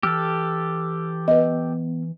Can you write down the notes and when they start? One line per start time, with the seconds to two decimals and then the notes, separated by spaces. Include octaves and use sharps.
0.03 E3 G4 A4 E6 F6
1.28 B3 B4 D#5